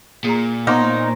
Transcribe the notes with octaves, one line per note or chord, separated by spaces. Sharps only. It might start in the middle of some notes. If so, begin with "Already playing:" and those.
A#2 G#4 A#5
B3 D#4 A#4 C5 C#5 D6